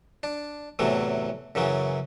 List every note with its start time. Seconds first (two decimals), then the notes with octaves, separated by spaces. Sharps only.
0.23 D4
0.79 E2 A2 C3 E3 F#3
1.55 F#2 C#3 E3 F#3